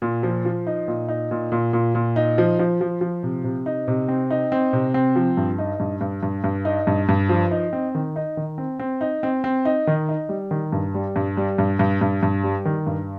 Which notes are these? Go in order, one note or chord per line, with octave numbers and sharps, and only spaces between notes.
A#2
F3
F3
D#4
A#2
D#4
A#2
A#2
A#2
A#2
D#4
F3
F3
F3
F3
C3
C3
D#4
C3
C4
D#4
C4
C3
C4
F3
G2
D#4
G2
G2
G2
G2
D#4
G2
G2
F3
D#4
C4
D#3
D#4
D#3
C4
C4
D#4
C4
C4
D#4
D#3
D#4
G3
D#3
G2
G3
G2
G3
G2
G2
G2
G2
G3
D#3
G2